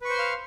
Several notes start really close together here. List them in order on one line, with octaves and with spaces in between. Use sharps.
B4 C#6 C5 C6 F5